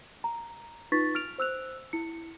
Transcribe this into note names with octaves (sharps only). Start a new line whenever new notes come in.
A#5
D#4 F4 B4 C#6 A6 B6
F6 D7 F7
C5 E6 F#6 F7
E4 C#7